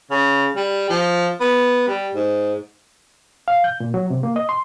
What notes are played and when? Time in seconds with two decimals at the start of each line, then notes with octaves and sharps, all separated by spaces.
0.11 C#3
0.56 G3
0.90 F3
1.40 B3
1.88 G3
2.14 G#2
3.48 F5
3.64 G6
3.80 A#2
3.94 F#3
4.10 C3
4.23 A#3
4.36 D#5
4.49 C6